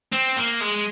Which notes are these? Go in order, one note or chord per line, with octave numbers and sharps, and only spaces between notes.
C4
A#3
G#3